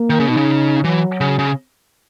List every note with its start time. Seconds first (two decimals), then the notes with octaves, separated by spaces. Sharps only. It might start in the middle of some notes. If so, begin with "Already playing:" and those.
Already playing: A#3
0.10 D#3
0.20 C#3
0.28 B2 D#4
0.37 C#3
0.84 E3 F#3
1.21 C#3
1.39 C#3